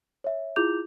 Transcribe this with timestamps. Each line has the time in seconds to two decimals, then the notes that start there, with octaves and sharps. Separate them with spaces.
0.24 C#5 E5
0.56 E4 F4 G#4 D6 G6 F7